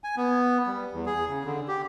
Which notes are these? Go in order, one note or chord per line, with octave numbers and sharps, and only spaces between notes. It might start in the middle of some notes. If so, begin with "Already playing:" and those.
G#5
B3
G3
E2
G#4
C#3
D3
G4